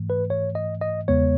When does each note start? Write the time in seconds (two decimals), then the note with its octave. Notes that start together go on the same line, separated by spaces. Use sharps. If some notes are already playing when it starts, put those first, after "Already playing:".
Already playing: G#2 E3 A3
0.10 B4
0.30 C#5
0.55 D#5
0.81 D#5
1.08 E2 C#3 G#3 B3 C#5